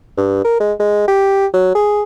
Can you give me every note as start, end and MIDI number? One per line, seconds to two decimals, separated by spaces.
0.17 0.41 43
0.44 0.58 70
0.60 0.73 56
0.80 1.06 56
1.08 1.47 67
1.54 1.75 54
1.75 2.03 68